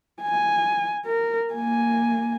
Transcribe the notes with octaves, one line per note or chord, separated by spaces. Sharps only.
G#5
A#4
A#3 G#5